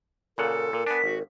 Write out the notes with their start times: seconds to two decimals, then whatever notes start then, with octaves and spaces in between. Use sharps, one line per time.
0.38 A#2 C#3 A4 A#4 F#5
0.73 A#2 A#4
0.87 B3 D4 G#5 B6
1.04 G#1 F#4